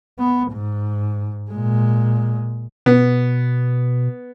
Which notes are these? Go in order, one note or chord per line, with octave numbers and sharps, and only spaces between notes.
B3
G#2
A#2 G#3
B2 B3